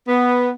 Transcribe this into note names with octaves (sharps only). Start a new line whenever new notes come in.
B3